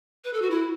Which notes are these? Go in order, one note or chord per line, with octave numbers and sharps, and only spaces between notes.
B4
A4
F#4
E4